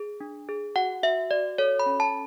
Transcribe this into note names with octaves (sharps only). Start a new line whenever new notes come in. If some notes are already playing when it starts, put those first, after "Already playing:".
Already playing: G#4
D4
G#4
F#4 F#5
F#4 E5
F#4 D5
A4 C#5
B5
C#4
A5